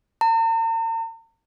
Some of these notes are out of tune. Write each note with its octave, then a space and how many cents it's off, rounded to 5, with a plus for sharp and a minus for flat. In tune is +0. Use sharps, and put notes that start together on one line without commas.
A#5 -45